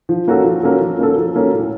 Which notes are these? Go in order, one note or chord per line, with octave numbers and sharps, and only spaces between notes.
F3
A#3 C#4 F#4 A4
F3
A#3 C#4 F#4 A4
F3
A#3 C#4 F#4 A4
F3
A#3 C#4 F#4 A4
A2